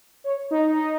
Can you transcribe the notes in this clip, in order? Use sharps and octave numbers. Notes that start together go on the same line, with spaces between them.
C#5
D#4
D#4